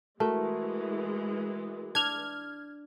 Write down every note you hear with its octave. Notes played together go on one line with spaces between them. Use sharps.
E3 G#3 A3 F#4 A#4
D4 F6 G#6